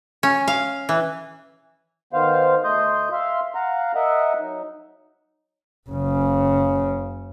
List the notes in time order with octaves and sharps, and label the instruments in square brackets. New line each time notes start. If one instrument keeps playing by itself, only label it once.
[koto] C#4
F5
E3
[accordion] D#3 B3 C5 F5
D2 A3 D#5 C6 D#6 G6
E5 F5 C6
F5 F#5 A#5
A#4 D#5 E5 F#5
F#3 D#4
[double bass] F#1 C#3